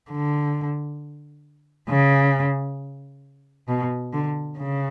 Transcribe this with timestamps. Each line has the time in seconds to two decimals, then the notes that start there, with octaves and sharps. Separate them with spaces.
0.11 D3
1.89 C#3
3.68 B2
4.13 D3
4.59 C#3